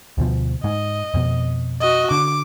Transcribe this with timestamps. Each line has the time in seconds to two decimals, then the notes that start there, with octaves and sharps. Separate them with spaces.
0.18 D2 B2 F3
0.64 G#2 D#5
1.14 F2 B2
1.81 F#4 D#5
2.11 D3 D6